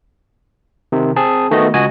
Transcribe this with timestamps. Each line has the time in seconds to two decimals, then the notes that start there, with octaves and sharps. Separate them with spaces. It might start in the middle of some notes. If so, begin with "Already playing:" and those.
0.92 C3 D#3
1.16 C4 G#4 A5
1.51 D#3 A3 B3 F#4 D#5
1.74 C#2 F#4 D#5 G#5